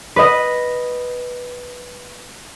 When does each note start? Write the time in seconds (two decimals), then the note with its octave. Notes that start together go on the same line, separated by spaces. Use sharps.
0.16 B4 D#5